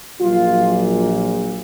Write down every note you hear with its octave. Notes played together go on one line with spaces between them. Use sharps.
A#1 A#2 F#3 F4